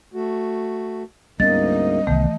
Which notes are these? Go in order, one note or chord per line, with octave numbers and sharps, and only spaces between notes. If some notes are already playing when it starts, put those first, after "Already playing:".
A3 F#4
D2 G#2 G3 A#3 B3 C#4 D#5 A6
C2 D#3 E3 A3 B3